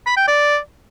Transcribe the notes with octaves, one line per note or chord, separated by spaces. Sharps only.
B5
G5
D5